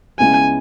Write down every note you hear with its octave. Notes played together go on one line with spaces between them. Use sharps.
C#2 C#3 G#3 B3 E4 G#5